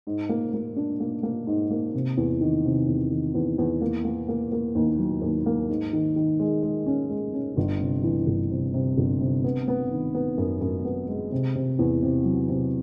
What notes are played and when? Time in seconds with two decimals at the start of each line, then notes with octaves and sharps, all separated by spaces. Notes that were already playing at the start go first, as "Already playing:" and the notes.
0.07 G#2
0.29 A#3
0.53 A#3
0.76 D4
1.00 A#3
1.23 A#3
1.47 G#2
1.70 A#3
1.94 C3
2.17 E2
2.41 D#3
2.65 C3
2.88 E2
3.11 D#3
3.35 E2
3.58 E2
3.82 A#3
4.05 A#3
4.28 A#3
4.52 A#3
4.75 D#2
4.99 F#3
5.22 D#2
5.46 A#3
5.69 G#2
5.93 D#3
6.16 D#3
6.40 G#3
6.63 G#3
6.86 C#4
7.10 G#3
7.33 C#4
7.57 G1
7.80 C3
8.03 E3
8.27 G1
8.51 C3
8.74 C3
8.97 G1
9.21 C3
9.44 B3
9.68 B3
9.91 D#3
10.15 B3
10.38 F#2
10.61 F#2
10.85 B3
11.08 G#3
11.32 C3
11.55 C3
11.79 E2
12.03 C3
12.25 F#3
12.49 C3